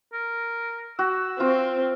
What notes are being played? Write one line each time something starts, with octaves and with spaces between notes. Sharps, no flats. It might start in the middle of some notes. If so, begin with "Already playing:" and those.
A#4
F#4 E6
C4 F4